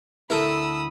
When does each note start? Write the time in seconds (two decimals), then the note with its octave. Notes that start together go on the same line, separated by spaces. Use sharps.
0.30 D2 E4 A4 A#4 B5 D#6 E6